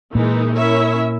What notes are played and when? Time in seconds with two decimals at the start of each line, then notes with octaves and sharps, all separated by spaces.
0.15 A#2 E3 G#3 A#3 D#4 A#4
0.56 C#4 E4 A#4 C#5 E5